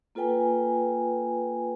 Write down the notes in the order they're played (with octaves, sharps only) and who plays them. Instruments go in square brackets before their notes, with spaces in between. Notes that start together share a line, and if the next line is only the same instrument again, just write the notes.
[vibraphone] A#3 F4 A4 B4 G5 G#5